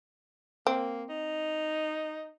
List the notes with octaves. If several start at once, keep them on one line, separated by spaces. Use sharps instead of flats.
A#3 C4
D#4